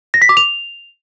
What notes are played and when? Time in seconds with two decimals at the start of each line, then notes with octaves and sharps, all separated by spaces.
0.14 A#6
0.22 B6
0.29 D6
0.37 F7